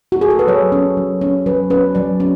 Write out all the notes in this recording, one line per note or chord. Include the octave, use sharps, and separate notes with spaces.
F#4
G#4
A4
B4
F#3 C#5
C#4
F#3
C#4
F#3 B4
C#4 B4
F#3 D5
C#4